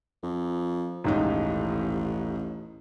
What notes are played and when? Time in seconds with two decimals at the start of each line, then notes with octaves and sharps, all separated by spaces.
0.23 F2
1.04 D#1 A1 G#2 D#4